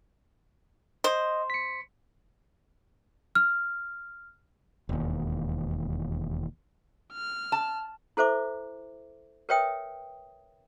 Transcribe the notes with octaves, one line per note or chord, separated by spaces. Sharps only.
C5 D#5
B6 C#7
F6
E1 D#2
F6
A5
E4 A4 C5 E5 D6
A#4 B4 C#5 E5 G5 D#6